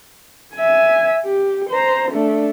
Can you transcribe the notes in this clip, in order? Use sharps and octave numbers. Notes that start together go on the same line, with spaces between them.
E5 G#5
G4
C5 A#5
A3 D4